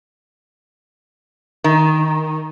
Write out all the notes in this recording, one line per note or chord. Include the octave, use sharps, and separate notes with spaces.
D#3